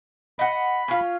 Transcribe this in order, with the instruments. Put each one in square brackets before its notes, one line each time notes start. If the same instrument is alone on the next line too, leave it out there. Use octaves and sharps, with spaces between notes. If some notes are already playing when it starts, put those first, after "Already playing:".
[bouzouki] D#5 F#5 [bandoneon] B5
[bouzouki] C#4 F4